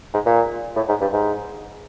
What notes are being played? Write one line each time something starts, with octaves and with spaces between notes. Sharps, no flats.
G#2
A#2
A2
G#2
G2
G#2